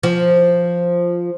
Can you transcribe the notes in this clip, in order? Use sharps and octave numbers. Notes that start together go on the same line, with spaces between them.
F3